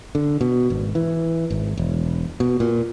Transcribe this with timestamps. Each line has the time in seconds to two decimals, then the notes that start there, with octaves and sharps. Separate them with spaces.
0.15 D3
0.41 B2
0.70 G#1
0.95 E3
1.51 G#1
1.77 E1
2.40 B2
2.60 A#2